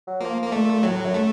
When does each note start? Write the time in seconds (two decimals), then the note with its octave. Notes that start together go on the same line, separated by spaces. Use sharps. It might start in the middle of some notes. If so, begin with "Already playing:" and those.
0.07 F#3
0.21 F3 A#3
0.42 A#3
0.52 A#2 A3
0.83 A2 F#3
1.05 F#2
1.14 A3